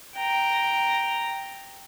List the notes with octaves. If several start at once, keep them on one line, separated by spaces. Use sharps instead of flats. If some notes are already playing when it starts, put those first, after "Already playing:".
G5 A#5